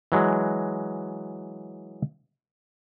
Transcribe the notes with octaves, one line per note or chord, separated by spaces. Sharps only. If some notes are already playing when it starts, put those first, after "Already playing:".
E3 F#3 G#3